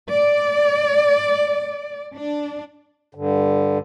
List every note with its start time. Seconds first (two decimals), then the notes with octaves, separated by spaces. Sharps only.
0.10 D5
2.15 D4
3.15 G2 D3